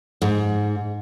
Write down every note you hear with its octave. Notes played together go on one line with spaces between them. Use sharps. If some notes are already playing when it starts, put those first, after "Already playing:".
G#2